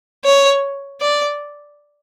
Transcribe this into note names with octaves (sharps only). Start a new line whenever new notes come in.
C#5
D5